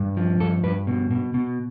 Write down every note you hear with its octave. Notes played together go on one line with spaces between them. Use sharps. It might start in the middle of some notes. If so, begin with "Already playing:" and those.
Already playing: G2
F3
G2 A4
G2 B4
B2
B2
B2